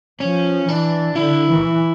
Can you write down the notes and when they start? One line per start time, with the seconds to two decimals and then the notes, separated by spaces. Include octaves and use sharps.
0.20 F3 C#4
0.68 E3 D4
1.15 D3 E4
1.47 E3